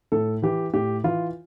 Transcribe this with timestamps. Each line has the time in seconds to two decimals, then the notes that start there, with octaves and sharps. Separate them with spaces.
0.12 A2 A4
0.42 E3 G4
0.74 A2 G4
1.04 E3 F4